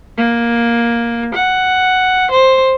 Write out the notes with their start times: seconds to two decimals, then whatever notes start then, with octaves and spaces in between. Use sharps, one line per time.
0.18 A#3
1.35 F#5
2.31 C5